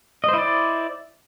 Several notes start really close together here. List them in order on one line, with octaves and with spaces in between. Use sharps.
D#5 C5 E4 D5